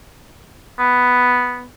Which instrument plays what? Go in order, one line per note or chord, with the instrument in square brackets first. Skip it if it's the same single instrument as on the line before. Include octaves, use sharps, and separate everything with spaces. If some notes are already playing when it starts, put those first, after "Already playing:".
[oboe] B3